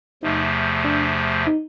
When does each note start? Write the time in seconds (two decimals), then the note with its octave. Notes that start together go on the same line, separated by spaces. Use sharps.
0.23 E2 C3 F3 A3 D#4
0.85 D4
1.47 D#4